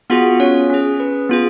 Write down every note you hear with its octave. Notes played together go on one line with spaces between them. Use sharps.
B3 F4 F#4 G#4 F#5
C#4 C#5
C#4 G#4
B4
B3 F4 G#4